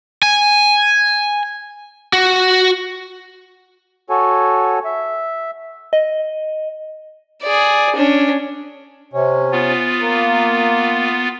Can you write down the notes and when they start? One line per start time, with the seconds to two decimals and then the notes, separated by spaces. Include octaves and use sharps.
0.23 G#5
2.13 F#4
4.10 F#4 A4 C#5 G#5
4.85 E5
5.93 D#5
7.42 G#4 D5
7.96 C#4 D4
9.13 C3 C#4
9.52 B3 F4
10.00 A#3